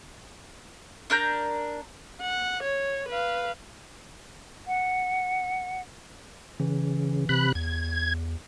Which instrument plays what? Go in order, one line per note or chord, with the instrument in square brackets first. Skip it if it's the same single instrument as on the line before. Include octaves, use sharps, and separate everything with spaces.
[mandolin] D4 A#4 A#5 G6
[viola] F#5
C#5
B4 F5
[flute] F#5
[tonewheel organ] C#3 [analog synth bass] E3
[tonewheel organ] C3 B5 F#6
[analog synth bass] E2 [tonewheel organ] G#6